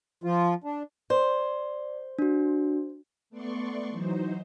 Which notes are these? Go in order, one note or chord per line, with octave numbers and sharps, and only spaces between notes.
F3 F4
D4
C5 D5
D4 F#4
A3 B3 D5 C6 C#6
E3 F#3 D#4 C5